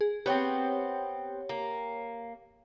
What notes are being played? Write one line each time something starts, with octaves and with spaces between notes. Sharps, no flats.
G#4
B3 C4 G4 C#5 G5
A#3